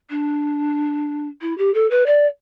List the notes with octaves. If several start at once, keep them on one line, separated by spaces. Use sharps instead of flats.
D4
E4
G4
A4
B4
D5